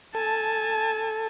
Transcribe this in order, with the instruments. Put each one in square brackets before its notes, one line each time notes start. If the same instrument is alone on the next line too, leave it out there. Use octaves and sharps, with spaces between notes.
[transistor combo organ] A4 [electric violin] G#5 A5